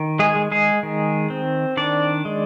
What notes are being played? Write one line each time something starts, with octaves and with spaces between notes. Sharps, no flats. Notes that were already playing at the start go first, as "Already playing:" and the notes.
Already playing: D#3
G#3 G#4
G#3
G#3 G#4
D#3
C4
D#3 D4 D5
G#3